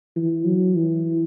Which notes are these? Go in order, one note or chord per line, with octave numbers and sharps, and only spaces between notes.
E3
F#3
E3